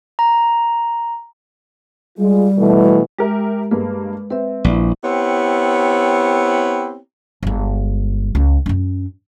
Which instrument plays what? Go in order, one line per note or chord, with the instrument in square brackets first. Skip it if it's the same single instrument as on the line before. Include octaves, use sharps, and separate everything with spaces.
[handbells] A#5
[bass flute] G3 [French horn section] G#3 F4 G#4
[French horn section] B2 E3 A3
[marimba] G#3 [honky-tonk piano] G4 A#4 E5
[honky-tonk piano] G2 G#3 A#3 [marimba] B4
[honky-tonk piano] C4 [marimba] B4 E5
[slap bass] A#1 [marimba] E4 D5
[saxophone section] B3 C4 E4 G4 C#5
[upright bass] G1 G#3
C#2
F#2 C#4